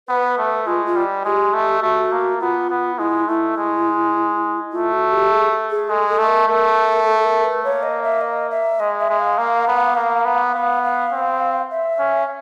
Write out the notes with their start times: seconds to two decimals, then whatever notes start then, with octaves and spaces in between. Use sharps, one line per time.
0.08 B3 B4
0.38 A3
0.66 G#3 F4
0.86 F4
0.96 G3
1.24 G#3 G4
1.54 A3
1.82 A3 F#4
2.12 A#3
2.40 B3 F4
2.70 B3
2.98 G#3 E4
3.28 A3 E4
3.57 G#3
4.73 A3 F4
4.93 F#4
5.13 G4
5.31 G#4
5.70 G#4
5.89 G#3 A4
6.08 A4
6.18 A3
6.27 A#4
6.47 A3 A#4
7.06 A4
7.19 A4
7.25 A#4
7.44 B4
7.64 A#3 C#5
7.83 D#5
8.03 E5
8.21 D#5
8.51 E5
8.80 G#3 D#5
8.99 E5
9.09 G#3
9.19 F5
9.38 A#3
9.67 B3
9.96 A#3
10.25 B3
10.54 B3 F5
10.84 F5
11.12 C4
11.71 E5
11.99 C#4